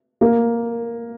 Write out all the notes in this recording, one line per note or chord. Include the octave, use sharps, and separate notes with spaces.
A#3